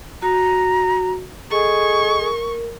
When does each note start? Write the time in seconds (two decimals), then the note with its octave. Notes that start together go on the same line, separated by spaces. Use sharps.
0.22 F#4 A#5
1.51 G#4 A4 D#5 C#6
2.21 A#4